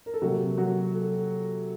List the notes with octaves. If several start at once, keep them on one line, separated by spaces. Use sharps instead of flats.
A#4
A4
C3 F#3 A#3 F#4
F#3 F#4
A4